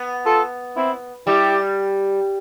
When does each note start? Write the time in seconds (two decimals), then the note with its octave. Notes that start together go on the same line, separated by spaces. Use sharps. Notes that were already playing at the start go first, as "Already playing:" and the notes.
Already playing: B3
0.25 F4 A4
0.76 C4 E4
1.27 G3 E4 G4